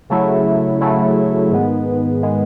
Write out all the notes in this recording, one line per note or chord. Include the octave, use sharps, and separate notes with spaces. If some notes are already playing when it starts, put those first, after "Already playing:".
C#3 F#3 A3 E4
C#3 F#3 A3 E4
G#2 D#3 G#3 B3
D#3 G#3 B3